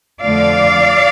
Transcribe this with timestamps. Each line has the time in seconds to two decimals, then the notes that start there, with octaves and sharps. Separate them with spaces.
0.21 F2 D3 F3 A3 D5 F5